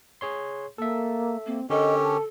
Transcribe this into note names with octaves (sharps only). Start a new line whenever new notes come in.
G#4 C#5 C6
A#3 A4 E5
A#3 C4
D3 C#4 G4 A4 A#4 D#5
A5